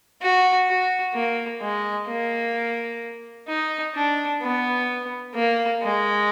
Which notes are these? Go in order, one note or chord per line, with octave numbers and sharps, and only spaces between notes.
F#4
F#4
A#3
G#3
A#3
D#4
D4
B3
A#3
G#3